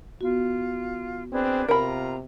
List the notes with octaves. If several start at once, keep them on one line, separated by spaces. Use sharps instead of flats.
B3 F4 F#4
C4 D4 G#4 B4
C3 F4 A#4 A#5 B5